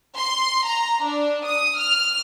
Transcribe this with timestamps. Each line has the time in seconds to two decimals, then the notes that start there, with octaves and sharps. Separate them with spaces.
0.17 C6
0.67 A#5
1.03 D4
1.46 D#6
1.78 F6